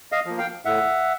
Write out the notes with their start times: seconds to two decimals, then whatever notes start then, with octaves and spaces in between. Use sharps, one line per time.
0.12 D#5 F5
0.26 F3 A#3
0.38 F5 G5
0.65 A2 E5 F#5